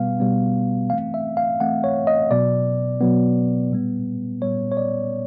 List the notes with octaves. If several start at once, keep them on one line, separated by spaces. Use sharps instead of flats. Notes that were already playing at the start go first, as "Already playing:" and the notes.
Already playing: B2 G3 B3 F5
B2 G3 B3
E3 A3 C4 F5
E5
F5
E3 A3 C4 F#5
C#5
D#5
B2 F#3 B3 D5
B2 F#3 B3
A#2 G3 B3
A#2 G3 B3 C#5
C#5
D5